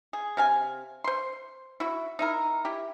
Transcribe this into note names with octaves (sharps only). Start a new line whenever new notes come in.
G#4
C3 F5 G#5
C5 C6
E4 F#4
D#4 E4 A#4
E4 G4